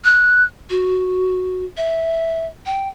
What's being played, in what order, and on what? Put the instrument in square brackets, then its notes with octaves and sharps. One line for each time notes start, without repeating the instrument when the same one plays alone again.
[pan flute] F#6
F#4
E5
G5